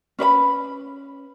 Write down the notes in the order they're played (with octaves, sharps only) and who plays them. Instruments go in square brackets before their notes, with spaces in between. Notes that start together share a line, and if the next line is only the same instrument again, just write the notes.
[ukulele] C#4 B4 C#5 B5